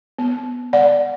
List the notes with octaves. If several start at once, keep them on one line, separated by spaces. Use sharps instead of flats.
B3
D5 F#5